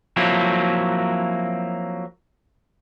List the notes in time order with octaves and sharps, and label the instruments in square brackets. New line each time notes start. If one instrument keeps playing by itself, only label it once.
[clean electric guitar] F3 F#3 A#3 C4 E4